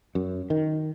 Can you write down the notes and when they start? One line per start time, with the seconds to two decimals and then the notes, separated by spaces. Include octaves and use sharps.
0.15 F#2
0.50 D#3